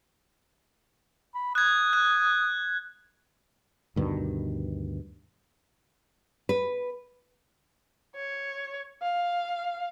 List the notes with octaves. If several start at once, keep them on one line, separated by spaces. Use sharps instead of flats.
B5
D#6 F#6 G#6
F#6
D2 G2 B2 D#3
B4
C#5
F5